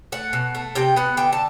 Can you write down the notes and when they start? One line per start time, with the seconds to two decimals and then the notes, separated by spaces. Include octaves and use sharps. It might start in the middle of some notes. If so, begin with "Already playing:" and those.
0.12 A3 F#5
0.33 B2
0.55 A3
0.75 C3 G5
0.96 B3 F#5
1.17 D3 G5
1.33 A5